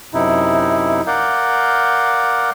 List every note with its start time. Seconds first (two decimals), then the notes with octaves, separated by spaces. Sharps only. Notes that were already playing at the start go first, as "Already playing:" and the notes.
0.14 F#2 C3 D#4 E4
1.07 A#4 D5 F5 F#5 G6